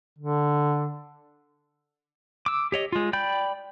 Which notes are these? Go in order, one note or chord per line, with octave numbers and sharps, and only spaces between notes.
D3
D6 E6
G4 C#5 D#5
G#3 F4
D5 G5 B5 G6